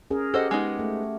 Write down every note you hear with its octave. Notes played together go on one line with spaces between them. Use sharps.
C#4 G#4 A#4
G4 A4 C5 D#5 F#5
G#3 B3 D#4
A3